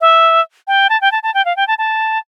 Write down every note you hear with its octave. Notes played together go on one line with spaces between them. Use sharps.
E5
G5
A5
G5
A5
A5
G5
F5
G5
A5
A5